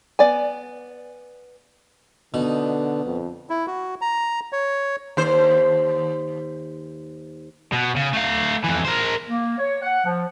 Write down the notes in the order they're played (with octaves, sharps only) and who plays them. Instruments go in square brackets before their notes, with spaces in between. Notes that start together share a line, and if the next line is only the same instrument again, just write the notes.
[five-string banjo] B3 D5 G#5
[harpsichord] B2 D#4 [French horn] D3
[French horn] F2
[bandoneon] E4
F#4
A#5
C#5
[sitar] D#2 C5
[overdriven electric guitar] B2
C#3
A3 F5
F2 E3
A#4 C5
[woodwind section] A#3
C#5
F#5
F3